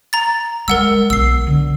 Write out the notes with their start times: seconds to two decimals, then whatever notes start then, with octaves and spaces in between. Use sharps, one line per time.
0.13 A#5 A6
0.68 G#3 A#4 F#5 E6
1.10 B1 E6 C7
1.47 D3